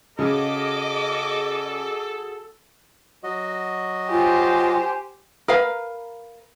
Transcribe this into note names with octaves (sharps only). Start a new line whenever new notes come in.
C#3 F#4 G#4 A4 D#5 D6
F#3 F#4 D#5
F4 G4 C5 G#5
A#4 B4 F5